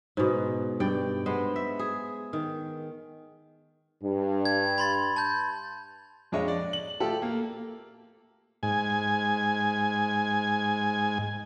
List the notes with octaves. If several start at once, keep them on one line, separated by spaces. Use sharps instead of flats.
G#2 B2
G2 D5 G5
G#3 B3 C5
E5
G#4
D#3
G2
G#6
B5 C6 A6
A5 G6
F2 G#3 D4 C#5 D#5 F5
D5
F#7
A3 F4 G4 A4
A#3
G#2 G#5